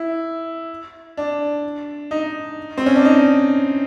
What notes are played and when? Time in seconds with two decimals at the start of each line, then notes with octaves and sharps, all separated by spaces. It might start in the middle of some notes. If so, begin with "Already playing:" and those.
Already playing: E4
1.17 D4
2.11 D#4
2.78 C4
2.86 C#4
2.96 D4
3.05 D#4